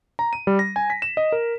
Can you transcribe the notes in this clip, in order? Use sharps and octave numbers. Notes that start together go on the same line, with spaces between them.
A#5
D#7
G3
A#6
G#5
B6
E7
D#5
A#4